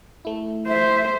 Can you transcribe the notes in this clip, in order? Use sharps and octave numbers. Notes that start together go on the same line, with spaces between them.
A3 E4
C5 E5